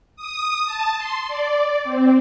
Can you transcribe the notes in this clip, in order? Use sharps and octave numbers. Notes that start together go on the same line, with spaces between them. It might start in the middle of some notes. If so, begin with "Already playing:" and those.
D#6
A5
C6
D5
C4